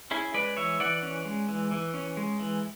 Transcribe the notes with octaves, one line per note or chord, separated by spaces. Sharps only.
C#4 E4 G#4
G#3 B4 D5
E3 C#5 E5
E3 D5 F#5
C#4
G#3
E3
E3
C#4
G#3
E3